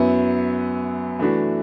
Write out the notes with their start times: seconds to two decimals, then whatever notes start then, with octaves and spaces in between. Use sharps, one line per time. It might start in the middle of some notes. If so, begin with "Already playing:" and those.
Already playing: F#2 F#3 B3 E4
1.19 E3 A3 D4 F#4